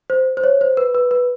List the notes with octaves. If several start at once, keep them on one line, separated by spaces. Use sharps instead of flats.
C5
C5
C#5
C5
B4
B4
B4